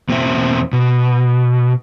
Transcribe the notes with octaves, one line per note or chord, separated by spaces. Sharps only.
E2 B2 A#3 C4 E5
B2